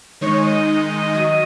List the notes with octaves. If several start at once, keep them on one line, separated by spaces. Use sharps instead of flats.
D#3 G#3 D#4 C#5
D#5
D#3 F#3 D#5